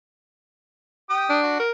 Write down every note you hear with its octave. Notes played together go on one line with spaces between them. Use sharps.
G4 G5 D#6
D4
F#4
A#4